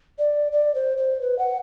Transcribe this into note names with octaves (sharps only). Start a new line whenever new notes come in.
D5
D5
C5
C5
B4
F#5